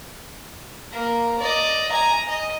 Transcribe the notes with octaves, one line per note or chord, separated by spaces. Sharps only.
A#3 A#4
D5 D#5
G#5 A#5
D#5